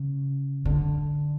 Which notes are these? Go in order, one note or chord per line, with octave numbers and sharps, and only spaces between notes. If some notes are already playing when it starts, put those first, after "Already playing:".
Already playing: C#3
D3